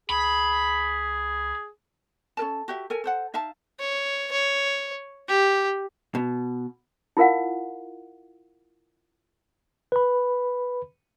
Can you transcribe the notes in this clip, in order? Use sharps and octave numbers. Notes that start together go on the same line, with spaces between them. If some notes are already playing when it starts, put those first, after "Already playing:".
C#2 G#4 B5
C#4 A4 A#4 A5
F#4 G4 E5
A4 A#4 G#5
A4 C5 F#5
D#4 E5 F5 A5
C#5
C#5
G4
B2
E4 F4 A#4 F5 F#5
B4 B5